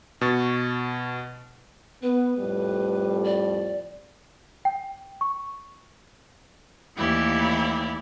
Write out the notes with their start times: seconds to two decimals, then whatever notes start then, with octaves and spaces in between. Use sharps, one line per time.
0.21 B2 C#6 A6
2.03 B3 B4
2.38 F2 A2 G3
3.24 D5
4.65 G5
5.21 C#6
6.97 D#2 E3 A3 E4 G4 D5